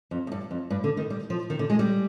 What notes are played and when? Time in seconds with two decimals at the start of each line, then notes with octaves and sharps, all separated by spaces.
0.11 F2
0.27 F2
0.32 G2
0.51 F2
0.70 G2
0.84 D3
0.97 D#3
1.10 G3
1.30 F3
1.50 D#3
1.59 D3
1.70 G#3
1.79 G3